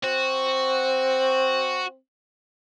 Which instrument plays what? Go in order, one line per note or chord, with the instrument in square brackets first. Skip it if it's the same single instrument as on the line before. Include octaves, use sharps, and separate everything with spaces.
[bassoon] C4 [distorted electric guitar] F#4